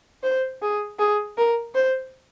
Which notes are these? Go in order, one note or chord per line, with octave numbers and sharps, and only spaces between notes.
C5
G#4
G#4
A#4
C5